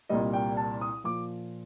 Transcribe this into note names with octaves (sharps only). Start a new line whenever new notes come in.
C2 A#2 G3 D#5
G5
A5
D#6
A#2 F3 D6